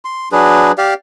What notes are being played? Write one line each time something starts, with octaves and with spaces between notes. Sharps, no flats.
C6
F#3 D4 G#4 B4
G4 D5 F5